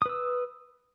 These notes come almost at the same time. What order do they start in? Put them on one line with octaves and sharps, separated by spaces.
D#6 B4 E6